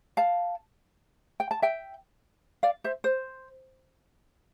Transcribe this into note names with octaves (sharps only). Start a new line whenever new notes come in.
F5 A5
G5
A5
E5 G5
D5 F5
C5 E5
C5